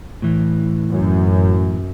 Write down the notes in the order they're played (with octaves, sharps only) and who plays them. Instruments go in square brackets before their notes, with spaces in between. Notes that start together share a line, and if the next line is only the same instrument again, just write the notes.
[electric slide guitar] A2 E3
[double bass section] F#2